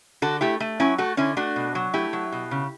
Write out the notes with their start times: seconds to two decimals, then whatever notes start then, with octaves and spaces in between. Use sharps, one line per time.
0.22 D3 F#4 A4
0.41 A3 E4 G4
0.60 A3
0.80 F#3 C#4 E4
0.98 A3 F#4 A4
1.17 D3 C#4 E4
1.37 A3 D4 F#4
1.56 B2
1.75 F#3
1.94 A3 E4 G4
2.13 F#3
2.33 B2
2.51 C#3